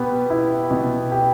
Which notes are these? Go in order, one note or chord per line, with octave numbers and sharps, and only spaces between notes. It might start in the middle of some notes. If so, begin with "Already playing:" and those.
Already playing: B2 B3 G4
E4
B2
G4